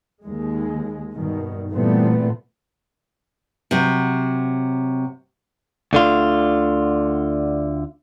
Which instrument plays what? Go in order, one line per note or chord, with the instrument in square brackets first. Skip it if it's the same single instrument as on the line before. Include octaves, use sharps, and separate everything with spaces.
[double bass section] D#2 G#3
G2 B2 D#3
A#2 E3 G3 A3 B3 C4
[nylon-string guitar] C3 F#3
[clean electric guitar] D2 D3 F4